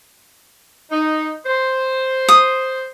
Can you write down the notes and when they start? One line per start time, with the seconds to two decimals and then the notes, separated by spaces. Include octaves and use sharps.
0.91 D#4
1.46 C5
2.28 D#6